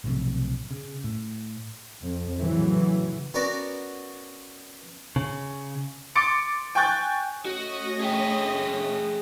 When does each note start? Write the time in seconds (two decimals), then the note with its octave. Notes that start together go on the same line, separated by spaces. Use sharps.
0.04 B1 A2 C3 F3
0.71 C#3
1.04 A2
2.01 F2
2.40 A2 C#3 E3 F#3
3.34 B3 C#4 F#4 A#4 D5
5.16 C#3
6.15 C6 D6 A6 C#7 D7
6.75 G5 G#5 C#6 F#6 G6 A6
7.45 A3 C#4 F#4 D#5
8.00 G#4 E5 G5